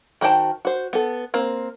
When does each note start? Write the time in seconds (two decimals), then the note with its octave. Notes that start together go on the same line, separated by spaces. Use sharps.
0.21 D#3 F#4 C5 G5 A5
0.65 F#4 C5
0.93 B3 A4
1.34 A#3 C4